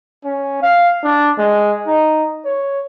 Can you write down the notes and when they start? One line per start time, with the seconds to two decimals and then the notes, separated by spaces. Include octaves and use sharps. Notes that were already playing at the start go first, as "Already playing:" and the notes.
0.24 C#4
0.62 F5
1.03 D4
1.38 G#3
1.87 D#4
2.45 C#5